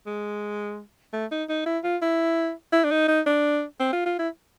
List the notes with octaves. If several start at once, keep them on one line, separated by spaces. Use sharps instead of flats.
G#3
A3
D#4
D#4
E4
F4
E4
E4
D4
D#4
D#4
D4
C4
F4
F4
E4